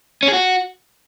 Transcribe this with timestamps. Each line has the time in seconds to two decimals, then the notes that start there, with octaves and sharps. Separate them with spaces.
0.23 C#4
0.28 G#4
0.33 F#4